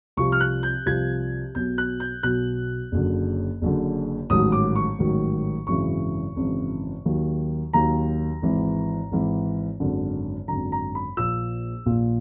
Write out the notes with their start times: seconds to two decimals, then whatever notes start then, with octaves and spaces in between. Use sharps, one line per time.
0.17 C2 C3 F3 C#6
0.32 F6
0.41 F#6
0.63 G6
0.86 C2 C3 F3 G#6
1.55 B1 B2 F#3 G6
1.78 F#6
2.00 G6
2.23 B1 B2 F#3 F#6
2.92 F#1 F#2 D3
3.62 F#1 F#2 D3
4.30 A1 G#2 D#3 F#3 D#6
4.52 D6
4.76 C#6
4.99 A1 G#2 D#3 F#3
5.67 G#1 F#2 C#3 E3 C#6
6.36 G#1 F#2 C#3 E3
7.06 D#2 D#3 F#3
7.73 D#2 D#3 F#3 A#5
8.42 G#1 G#2 E3
9.11 G#1 G#2 E3
9.80 G#1 F#2 D3
10.48 G#1 F#2 D3 A#5
10.72 A#5
10.95 B5
11.17 A#1 A#2 F3 E6
11.86 A#1 A#2 F3